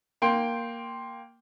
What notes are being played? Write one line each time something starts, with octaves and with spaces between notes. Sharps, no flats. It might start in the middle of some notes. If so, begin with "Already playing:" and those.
A#3 G5 C6